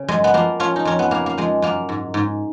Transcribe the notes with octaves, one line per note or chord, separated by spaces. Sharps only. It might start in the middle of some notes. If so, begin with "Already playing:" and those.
Already playing: C#3
F#2 G#3
B3
F3 A#3
F3 C#4 F4
D#4
F2 C#4
B3
C#3 A#3
A#3
F3 G#3
F#2 A#3
G#2
G#2